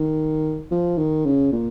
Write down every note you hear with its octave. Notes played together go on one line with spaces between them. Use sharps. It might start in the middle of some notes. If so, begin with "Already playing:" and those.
Already playing: D#3
F3
D#3
C#3
A#2